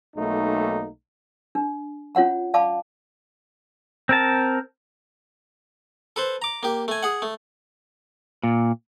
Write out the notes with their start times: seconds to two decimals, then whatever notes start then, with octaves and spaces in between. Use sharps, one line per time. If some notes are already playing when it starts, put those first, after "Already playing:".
0.16 B1 A3 A#3 D#4
1.55 D4
2.15 C#4 F4 C#5 F#5 A#5
2.54 D5 F5 A5 B5 D6
4.09 C4 A#4 A5
6.16 A4 B4 C5
6.42 A#5 D6
6.63 A#3 G4
6.88 A3 G#5
7.03 G#4 F#5
7.22 A3
8.43 A#2